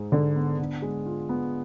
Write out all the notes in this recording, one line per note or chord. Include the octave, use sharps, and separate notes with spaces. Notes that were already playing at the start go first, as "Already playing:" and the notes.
Already playing: G#2 G#3
G#2 D3
B3
D3
G#3
F4
B3